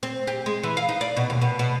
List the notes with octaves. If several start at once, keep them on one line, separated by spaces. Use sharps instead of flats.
C4
G4
G#3
E3
F5
D#4
D5
B2
D#2
B2
B2